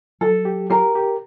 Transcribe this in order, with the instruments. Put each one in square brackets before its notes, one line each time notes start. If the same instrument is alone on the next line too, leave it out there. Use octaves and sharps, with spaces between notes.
[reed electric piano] F#3 [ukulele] A4
[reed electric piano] G4
[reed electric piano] G4 [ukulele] A#4
[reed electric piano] G4